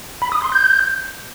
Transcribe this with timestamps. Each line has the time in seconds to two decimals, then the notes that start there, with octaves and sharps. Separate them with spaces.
0.22 B5
0.32 D#6
0.42 C6
0.52 G6